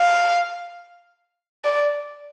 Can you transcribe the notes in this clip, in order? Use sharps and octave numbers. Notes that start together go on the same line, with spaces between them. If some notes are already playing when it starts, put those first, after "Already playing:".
Already playing: F5
D5